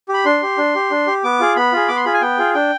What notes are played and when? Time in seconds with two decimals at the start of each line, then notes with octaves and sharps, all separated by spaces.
0.09 G4
0.14 B5
0.25 D4 C6
0.42 G4
0.58 D4
0.75 G4
0.91 D4
1.07 G4
1.24 B3 D6
1.40 F4 G#4
1.56 B3 B5
1.73 F4 G#4
1.88 B3 D6
1.96 C6
2.04 F4 G#4 B5
2.14 G#5
2.21 B3 G5
2.38 F4 G#4
2.54 D4 G5